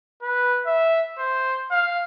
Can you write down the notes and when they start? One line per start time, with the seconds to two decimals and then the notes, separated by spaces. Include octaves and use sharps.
0.22 B4
0.66 E5
1.18 C5
1.71 F5